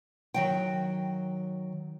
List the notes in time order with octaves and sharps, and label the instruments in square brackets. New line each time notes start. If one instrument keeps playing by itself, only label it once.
[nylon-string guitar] D#3 F#3 G5